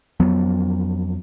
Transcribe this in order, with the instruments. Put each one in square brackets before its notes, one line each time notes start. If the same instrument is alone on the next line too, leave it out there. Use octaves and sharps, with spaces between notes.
[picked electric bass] F2 F#3 B3